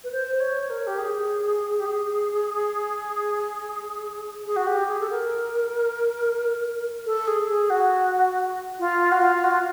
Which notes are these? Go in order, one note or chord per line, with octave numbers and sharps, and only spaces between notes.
B4
C5
C5
C#5
A#4
G4
G#4
G4
G#4
G#4
F#4
G4
G#4
A4
A#4
A4
G#4
G#4
F#4
F4
F#4
F4
F#4
F4